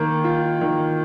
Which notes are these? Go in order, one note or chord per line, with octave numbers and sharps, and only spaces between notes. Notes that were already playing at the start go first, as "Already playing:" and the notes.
Already playing: D#3 A#3
F4
D#3